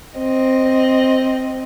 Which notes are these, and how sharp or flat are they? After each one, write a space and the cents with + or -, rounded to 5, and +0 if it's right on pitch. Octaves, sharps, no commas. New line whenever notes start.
C4 +0 D#5 +0